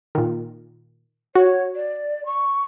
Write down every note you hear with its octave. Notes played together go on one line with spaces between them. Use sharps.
A#2 D#3
F#4 C#5
D5
C#6